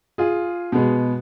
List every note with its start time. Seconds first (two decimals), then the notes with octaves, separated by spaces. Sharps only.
0.18 F4 G#4
0.72 B2 G#3 B3